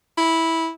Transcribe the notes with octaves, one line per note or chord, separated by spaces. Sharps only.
E4